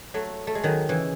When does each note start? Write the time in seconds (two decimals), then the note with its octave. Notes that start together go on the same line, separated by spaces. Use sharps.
0.14 F#3 A3
0.47 A3
0.55 G#3
0.64 D#3 F#3
0.89 C#3 E3